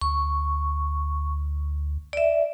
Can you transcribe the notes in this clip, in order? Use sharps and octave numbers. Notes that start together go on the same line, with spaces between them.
D2 C#6
D5 E5